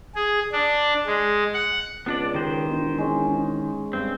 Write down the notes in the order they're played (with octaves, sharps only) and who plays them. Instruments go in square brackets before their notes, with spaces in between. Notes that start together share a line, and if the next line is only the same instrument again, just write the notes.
[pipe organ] G#4
D4
G#3
F#5
[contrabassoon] C#2 [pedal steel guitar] B3 D4 D5
[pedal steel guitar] D#3 C5 [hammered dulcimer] G4
[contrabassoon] E1
[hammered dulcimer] G#3 C#4
[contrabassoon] G2 [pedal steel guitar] C4